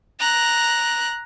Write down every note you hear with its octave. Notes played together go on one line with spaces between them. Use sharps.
A#5 F#6